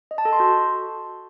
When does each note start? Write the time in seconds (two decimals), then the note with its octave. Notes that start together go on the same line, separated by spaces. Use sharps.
0.11 D#5
0.18 A5
0.25 A4
0.33 C6
0.40 F#4